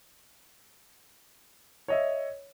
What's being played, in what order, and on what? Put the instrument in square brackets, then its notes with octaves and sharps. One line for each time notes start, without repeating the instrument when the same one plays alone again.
[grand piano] C#5 D#5 E5